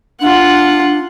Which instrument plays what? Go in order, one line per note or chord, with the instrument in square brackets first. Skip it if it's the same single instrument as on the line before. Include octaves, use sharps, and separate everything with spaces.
[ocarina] D4 [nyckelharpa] F4 F#5